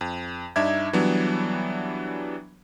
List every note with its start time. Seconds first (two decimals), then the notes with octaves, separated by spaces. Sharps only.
0.01 F2
0.56 G2 D4 D#4 E5 D6 G#6
0.93 E3 F#3 G3 B3 D4